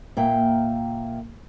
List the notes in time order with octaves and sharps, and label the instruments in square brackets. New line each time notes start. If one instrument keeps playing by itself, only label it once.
[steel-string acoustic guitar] A#2 A#3 E5 G5